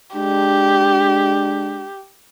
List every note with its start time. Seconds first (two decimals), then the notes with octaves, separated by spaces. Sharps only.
0.16 G#3 D4 G4